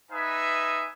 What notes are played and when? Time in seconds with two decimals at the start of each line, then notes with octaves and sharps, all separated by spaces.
0.11 D#4 B4 E5 G#5 D#6